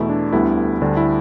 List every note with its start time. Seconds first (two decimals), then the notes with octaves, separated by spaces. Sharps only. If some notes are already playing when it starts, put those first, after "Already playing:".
Already playing: E2 B2 A3 E4
0.09 D4
0.32 D2 D3 G3 B3 E4
0.81 D2 D3 G3 D4
0.97 E4